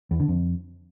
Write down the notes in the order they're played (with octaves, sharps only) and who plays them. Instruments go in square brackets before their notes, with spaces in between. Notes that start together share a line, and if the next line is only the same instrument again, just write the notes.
[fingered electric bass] E2
D3
F2